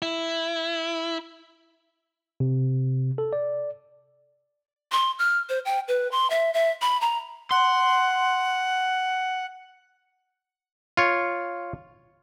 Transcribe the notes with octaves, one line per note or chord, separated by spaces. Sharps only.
E4
C3
A4
D5
C6
F6
C5
G5
B4
C6
E5
E5
B5
A#5
F#5 C6
F4 C#5